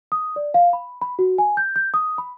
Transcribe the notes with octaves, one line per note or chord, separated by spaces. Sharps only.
D#6
D5
F5
B5
B5
F#4
G#5
G6
G6
D#6
B5